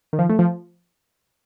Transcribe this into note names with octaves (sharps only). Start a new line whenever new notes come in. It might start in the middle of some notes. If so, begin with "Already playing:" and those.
D#3
F3
A3
F3